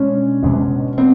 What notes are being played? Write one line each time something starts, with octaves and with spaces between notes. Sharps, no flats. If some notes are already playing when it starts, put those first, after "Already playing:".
Already playing: B2 G#3 C#4 D4
B2 G#3 B3 D4
B3 C4 D4